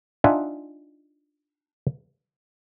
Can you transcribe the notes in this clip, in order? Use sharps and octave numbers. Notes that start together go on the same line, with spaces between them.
D4 D#4 F4 E5 F#5 G#5